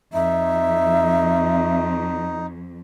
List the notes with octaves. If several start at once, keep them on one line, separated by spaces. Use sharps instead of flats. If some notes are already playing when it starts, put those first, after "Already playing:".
F2 D#4 E5